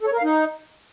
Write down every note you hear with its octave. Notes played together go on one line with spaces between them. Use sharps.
A4
C#5
A#4
F5
D#4